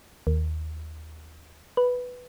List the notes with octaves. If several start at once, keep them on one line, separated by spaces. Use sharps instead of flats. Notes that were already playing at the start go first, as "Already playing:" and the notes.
D#2
B4